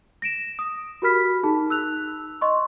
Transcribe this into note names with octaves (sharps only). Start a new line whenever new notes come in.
A#6 D7 E7
D#6
F#4 G4 A#4 B5 F6 B6
D#4 G#4 A5
E6 F#6 F7
D#5 C6 C#6